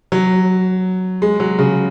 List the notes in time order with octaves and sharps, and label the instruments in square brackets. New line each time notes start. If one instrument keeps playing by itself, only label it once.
[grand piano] F#3
G#3
F#3
C#3